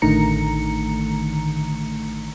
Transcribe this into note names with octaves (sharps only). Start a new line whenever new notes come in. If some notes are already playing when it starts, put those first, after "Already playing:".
A1 D3 D#3 A3 A#5 C#7